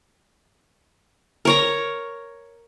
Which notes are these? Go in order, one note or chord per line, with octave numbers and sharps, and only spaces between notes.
A#4 C#5 A#5